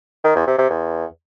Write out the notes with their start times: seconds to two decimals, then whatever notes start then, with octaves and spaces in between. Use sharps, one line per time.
0.24 D#3
0.36 E2
0.47 C3
0.59 C3
0.70 E2